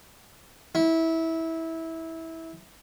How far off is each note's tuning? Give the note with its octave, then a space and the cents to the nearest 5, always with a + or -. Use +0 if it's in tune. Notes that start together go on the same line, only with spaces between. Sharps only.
E4 -20